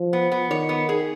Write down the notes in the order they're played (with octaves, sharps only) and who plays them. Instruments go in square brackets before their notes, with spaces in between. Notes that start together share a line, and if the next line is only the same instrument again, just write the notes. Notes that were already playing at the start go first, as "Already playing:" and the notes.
Already playing: [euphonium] F3
[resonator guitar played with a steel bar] B3
B3
[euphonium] D#3 [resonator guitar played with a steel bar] C#5
[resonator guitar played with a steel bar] B3
G#4